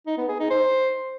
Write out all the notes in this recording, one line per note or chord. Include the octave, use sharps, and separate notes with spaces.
D#4
B3
G#4
D#4
C5